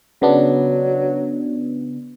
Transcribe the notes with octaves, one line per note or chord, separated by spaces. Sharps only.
C#3 F#3 B3 D4